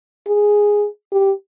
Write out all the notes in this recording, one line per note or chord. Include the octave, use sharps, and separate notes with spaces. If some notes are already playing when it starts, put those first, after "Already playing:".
G#4
G4